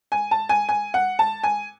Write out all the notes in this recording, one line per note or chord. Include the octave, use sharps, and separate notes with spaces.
G#5
A5
G#5
G#5
F#5
A5
G#5